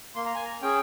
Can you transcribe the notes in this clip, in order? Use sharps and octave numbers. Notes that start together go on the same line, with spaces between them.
A#3 C6
A#5
G#5
A#5
C#4 G#4 G5